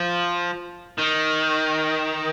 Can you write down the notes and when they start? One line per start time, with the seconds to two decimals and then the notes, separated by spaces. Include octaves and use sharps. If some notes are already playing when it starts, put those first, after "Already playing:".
Already playing: F3
0.98 D#3